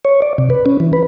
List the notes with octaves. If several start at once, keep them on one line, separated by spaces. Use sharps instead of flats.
C#5
D5
C3
B4
C#4
E3
B4